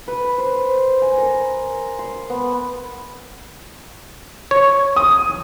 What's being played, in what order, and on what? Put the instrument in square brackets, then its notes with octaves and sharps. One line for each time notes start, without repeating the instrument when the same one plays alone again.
[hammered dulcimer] B4
C5
G#5
A#4
C6
B3
[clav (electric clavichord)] C#5
[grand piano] D#6